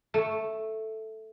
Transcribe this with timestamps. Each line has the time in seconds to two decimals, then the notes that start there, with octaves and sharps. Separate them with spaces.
0.14 A3